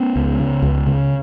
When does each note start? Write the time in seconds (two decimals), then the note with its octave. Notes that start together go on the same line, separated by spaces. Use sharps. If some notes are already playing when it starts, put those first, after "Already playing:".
Already playing: B3 C#4
0.16 C#2
0.40 C#3
0.62 C#2
0.87 C#3